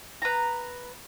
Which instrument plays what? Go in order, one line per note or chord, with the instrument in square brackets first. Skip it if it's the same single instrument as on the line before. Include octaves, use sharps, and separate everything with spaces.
[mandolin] B4 A#5